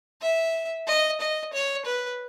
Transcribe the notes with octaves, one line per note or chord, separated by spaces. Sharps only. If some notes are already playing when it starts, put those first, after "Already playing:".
E5
D#5
D#5
C#5
B4